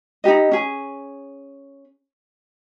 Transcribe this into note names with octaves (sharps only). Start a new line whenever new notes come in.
D#4 E4 G4 D#5
C#4 G#4